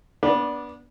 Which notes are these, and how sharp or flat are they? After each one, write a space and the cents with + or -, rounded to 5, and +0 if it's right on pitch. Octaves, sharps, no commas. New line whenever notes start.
B3 -20 D4 -10 D5 +0